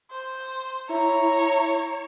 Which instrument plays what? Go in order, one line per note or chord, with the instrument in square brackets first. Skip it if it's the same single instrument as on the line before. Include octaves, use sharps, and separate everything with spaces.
[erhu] C5
[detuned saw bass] E4 [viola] C#5 [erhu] A#5